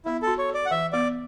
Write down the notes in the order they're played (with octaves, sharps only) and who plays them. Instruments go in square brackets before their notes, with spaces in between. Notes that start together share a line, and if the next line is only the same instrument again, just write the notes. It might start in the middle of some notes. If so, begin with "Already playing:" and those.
[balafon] B3 [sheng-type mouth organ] E4
[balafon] F#4 [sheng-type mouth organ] A4
[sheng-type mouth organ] C#5
[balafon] A4
[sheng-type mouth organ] D5
F#5
[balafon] E3 [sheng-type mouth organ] E5
[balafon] B3 [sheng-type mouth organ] D5